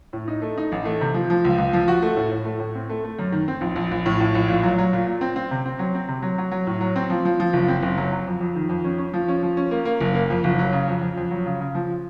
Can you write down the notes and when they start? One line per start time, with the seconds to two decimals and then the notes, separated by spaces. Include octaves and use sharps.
0.13 A2
0.28 D#4
0.42 A3
0.58 D#4
0.72 A1
0.85 A3
1.01 C3
1.14 F3
1.30 F3
1.45 C#2
1.58 C#2
1.73 F3
1.88 F#4
2.02 A3
2.17 A2
2.31 A2
2.45 A3
2.60 A2
2.75 C4
2.90 A3
3.04 A3
3.19 F#2
3.32 D#3
3.48 C4
3.61 A#1
3.76 A#1
3.91 A#1
4.06 A2
4.20 A2
4.35 A#1
4.48 A#2
4.63 F#3
4.78 F#3
4.93 A#2
5.07 A#2
5.21 C4
5.36 C4
5.51 C3
5.66 C4
5.79 F#3
5.95 C4
6.08 C3
6.22 F#3
6.38 F#3
6.51 F#3
6.67 A2
6.81 F#3
6.96 C4
7.10 F3
7.25 F3
7.40 F3
7.53 F#1
7.68 C4
7.83 F#1
7.97 F#3
8.12 F#3
8.27 F2
8.41 F2
8.55 D#3
8.69 F2
8.84 C#4
8.98 C#4
9.14 F3
9.28 C#4
9.43 F3
9.57 C#4
9.71 A#3
9.85 A#3
10.01 F#1
10.15 A#3
10.30 F2
10.44 F#1
10.59 F#3
10.72 C#3
10.88 F2
11.01 F2
11.17 F2
11.31 F#3
11.46 C#3
11.61 C#3
11.75 F3